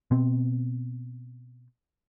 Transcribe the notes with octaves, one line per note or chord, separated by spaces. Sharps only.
B2 C4